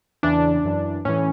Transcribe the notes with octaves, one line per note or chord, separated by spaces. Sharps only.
E2 C#3 E3 D4
F#2 E3
A2 E3 C#4